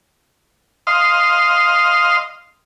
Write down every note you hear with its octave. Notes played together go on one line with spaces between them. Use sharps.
D#5 F5 C6